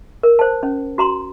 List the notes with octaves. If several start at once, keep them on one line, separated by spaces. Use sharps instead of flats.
A#4
C5 A5
C#4
F#4 A#5 C6